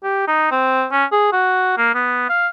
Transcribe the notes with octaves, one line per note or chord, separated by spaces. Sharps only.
G4
D#4
C4
C#4
G#4
F#4
A#3
B3
F5